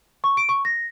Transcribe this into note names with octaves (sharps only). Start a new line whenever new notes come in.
C#6
D7
C#6
A#6